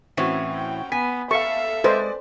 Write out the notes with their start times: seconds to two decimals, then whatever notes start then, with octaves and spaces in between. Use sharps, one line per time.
0.17 A2 E3 C4 C#4 F#4
0.53 G5
0.92 B3 G#5 B6
1.31 A4 E5 F5 C#6
1.84 G#3 A4 B4 C5 D5